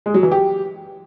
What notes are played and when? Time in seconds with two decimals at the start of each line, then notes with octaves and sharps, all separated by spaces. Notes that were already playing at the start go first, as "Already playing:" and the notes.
0.06 G#3
0.14 F#3
0.23 E3
0.32 G4